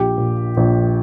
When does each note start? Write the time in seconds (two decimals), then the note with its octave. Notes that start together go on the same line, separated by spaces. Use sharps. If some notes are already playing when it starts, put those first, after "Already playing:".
Already playing: A#1 G4
0.18 A#2
0.57 A#1